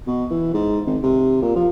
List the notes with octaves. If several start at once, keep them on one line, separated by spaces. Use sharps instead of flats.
B2
E3
G#2
G#1
C3
A#2
F3